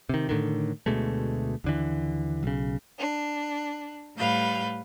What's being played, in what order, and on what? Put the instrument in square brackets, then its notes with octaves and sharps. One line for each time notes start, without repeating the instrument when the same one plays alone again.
[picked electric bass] C3 D#3
A2 D3 D#3
D2 B2 G#3 A3
D#2 D3 E3
B1 C#3
[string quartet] D4
A2 G3 B4 F5 G6